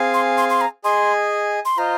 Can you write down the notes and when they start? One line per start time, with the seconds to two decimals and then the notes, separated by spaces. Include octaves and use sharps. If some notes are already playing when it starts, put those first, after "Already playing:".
Already playing: C4 G#4 F5 G#5
0.14 C6
0.38 C6
0.50 C6
0.61 A#5
0.84 G#4 D#5 G#5 C6
1.65 C6
1.77 F4 C5 D#5 A#5